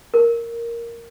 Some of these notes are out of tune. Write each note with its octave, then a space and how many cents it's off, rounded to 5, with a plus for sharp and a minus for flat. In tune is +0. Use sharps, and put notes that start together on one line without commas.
A#4 +0